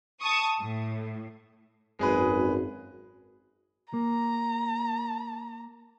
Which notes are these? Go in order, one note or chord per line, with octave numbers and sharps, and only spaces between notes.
A5 C#6 D#6
A2
G#1 F#2 G#3 G#4 B4
A#3 A#5